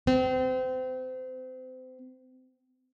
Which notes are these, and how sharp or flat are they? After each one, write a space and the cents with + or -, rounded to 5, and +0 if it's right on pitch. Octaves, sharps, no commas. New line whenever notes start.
C4 -30